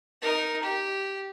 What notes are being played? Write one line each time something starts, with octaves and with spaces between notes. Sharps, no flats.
D#4 A#4
G4